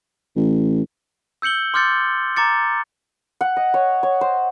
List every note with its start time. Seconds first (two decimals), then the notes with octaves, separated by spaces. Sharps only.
0.36 A1
1.42 E6 G6 C#7 F#7 G7
1.74 C6 D6 F6 G6 A6 C#7
2.36 A#5 D6 A6 C#7
3.41 F#5
3.57 D#5
3.74 C#5
4.03 C#5
4.21 C5